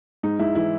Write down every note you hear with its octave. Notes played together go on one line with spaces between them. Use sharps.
G#2 D#4
G#2 E4
E3 E4